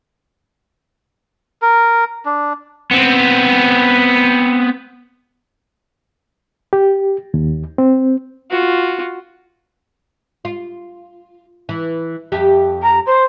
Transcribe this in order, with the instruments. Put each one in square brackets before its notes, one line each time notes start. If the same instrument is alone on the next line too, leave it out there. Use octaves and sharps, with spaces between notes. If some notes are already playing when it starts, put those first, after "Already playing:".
[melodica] A#4
D4
[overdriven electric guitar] B3 C4
[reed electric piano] G4
D#2
C4
[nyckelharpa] F4 F#4
[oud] F4
E3
F2 G4 E5
[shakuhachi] A#5
C5